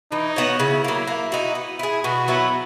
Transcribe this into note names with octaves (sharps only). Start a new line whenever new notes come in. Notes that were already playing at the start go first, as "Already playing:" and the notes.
E3 D#4
B3 F#4 C#5
C#3 E4
F#3 A#3
A#3
D#4 F#4
B3
E4 G#4
B2 F#4
F#3 B3 E4